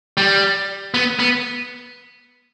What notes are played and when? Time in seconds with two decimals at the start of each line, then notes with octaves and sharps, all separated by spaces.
0.17 G3
0.94 B3
1.19 B3